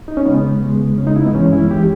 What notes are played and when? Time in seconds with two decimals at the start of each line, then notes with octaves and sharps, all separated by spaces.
0.08 D#4
0.17 C#4
0.26 C#2 C#3 G#3 B3
0.62 D#2 C#3 G#3
0.98 D#2 C#3 G#3 C#4
1.07 D#4
1.16 E4
1.25 B3
1.34 G2 E3 G#3 C#4
1.53 E4
1.71 E3 G#3 G4